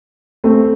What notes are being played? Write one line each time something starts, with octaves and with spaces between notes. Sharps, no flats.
A3 C4